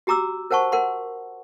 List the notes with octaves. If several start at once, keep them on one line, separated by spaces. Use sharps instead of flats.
F#4 G4 A#5 D6 E6
A#4 C5 F#5 A5 C#6
A#4 F#5 C6